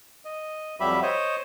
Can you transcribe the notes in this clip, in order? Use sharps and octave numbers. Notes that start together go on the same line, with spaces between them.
D#5
F2 F#3 G3 G4 E5 B5
C5 C#5 D#5